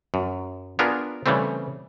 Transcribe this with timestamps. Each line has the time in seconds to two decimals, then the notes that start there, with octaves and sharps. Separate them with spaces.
0.14 F#2
0.79 B3 D4 F4 G#4 A#4
1.26 C#3 E3 G3 A3 C4